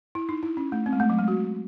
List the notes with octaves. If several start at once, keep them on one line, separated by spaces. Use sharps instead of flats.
E4
D#4
E4
C#4
A3
C4
G#3
A3
F#3
G#3
F#4